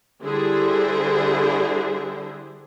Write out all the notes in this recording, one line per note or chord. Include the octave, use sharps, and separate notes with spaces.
D3 G3 E4 G#4 C5